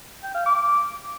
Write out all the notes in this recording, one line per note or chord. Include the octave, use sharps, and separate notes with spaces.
G5
F5
D6